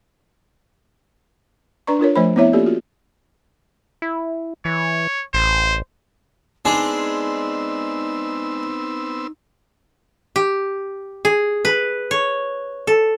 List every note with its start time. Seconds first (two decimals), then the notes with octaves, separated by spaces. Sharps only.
1.87 D4 B4 D5 A#5 C#6
1.99 D4 F4 A#4 C#5
2.16 F3 A3 C5 C#5 B5
2.36 B3 C4 E4 C#5 E5
2.53 A#3 C#4 F4 G4 A4 D5
2.66 F4 F#4
4.02 E4
4.65 E3 C#5
5.34 A1 C5
6.65 G#3 B3 C4 D4 D#4 G#4 E6
10.36 G4
11.25 G#4
11.65 B4
12.11 C#5
12.87 A4